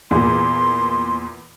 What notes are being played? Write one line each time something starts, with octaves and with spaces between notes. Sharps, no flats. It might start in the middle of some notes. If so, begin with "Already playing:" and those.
E2 A#2 C6